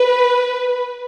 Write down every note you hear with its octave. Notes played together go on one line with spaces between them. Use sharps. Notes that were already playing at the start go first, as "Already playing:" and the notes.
Already playing: B4